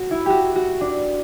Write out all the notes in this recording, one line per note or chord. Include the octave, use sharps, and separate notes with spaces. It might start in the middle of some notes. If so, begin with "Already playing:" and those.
Already playing: F#4
E4
F#4 G4
F#4
D4